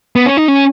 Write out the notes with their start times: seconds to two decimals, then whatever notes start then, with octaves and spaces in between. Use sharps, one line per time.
0.16 B3
0.26 C#4
0.37 D#4
0.48 C#4